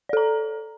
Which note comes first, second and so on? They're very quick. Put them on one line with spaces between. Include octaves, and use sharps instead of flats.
D5 A4 A#5